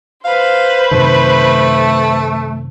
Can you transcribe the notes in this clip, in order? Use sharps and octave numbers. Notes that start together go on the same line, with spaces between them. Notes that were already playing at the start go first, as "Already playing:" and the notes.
B4 C5 F5
F#2 C3 D#3 A3